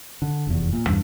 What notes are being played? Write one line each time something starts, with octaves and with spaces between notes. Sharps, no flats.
D3
F1 E2
A#2
E2 G2 D4